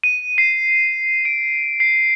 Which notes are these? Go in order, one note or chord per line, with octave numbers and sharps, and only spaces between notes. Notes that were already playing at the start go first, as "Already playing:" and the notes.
D#7
C7
D7
C7